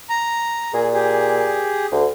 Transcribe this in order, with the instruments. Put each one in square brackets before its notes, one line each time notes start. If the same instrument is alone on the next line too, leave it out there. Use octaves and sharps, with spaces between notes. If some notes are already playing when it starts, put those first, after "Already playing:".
[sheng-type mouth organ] A#5
[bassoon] A#2 [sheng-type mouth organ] G#4
[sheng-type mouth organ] G4 G#4
[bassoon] D2